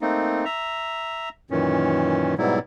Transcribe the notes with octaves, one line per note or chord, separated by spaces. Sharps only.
A3 A#3 C4 D#4
E5 A#5
F#2 A#2 D#3 E3 C#4
G#2 B2 F#3 G3 E4